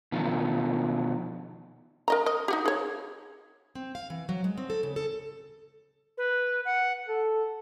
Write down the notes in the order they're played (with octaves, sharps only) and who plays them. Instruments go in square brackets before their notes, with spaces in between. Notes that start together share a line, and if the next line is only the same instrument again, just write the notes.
[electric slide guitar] B2 D#3 F3
[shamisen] A#4 D#5 A#5
D#5
D#4 F#4 G4
G#4 C#5
[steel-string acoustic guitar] C4
F5
E3
F#3
G#3
C4
A4
C#3
A4
[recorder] B4
F#5
[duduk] A4